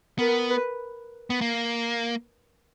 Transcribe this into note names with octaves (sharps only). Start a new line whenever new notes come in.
B3 A#4
B4
B3
A#3